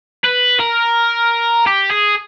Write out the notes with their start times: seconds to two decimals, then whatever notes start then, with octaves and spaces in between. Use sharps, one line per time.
0.24 B4
0.60 A#4
1.66 G4
1.90 G#4